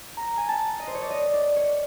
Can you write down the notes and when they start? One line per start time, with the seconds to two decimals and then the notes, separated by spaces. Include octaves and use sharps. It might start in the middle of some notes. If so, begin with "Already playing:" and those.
0.17 A#5
0.37 G#5
0.49 A5
0.79 D#5
0.87 C5
0.95 C#5
1.02 D5
1.10 D#5
1.33 D5
1.56 C#5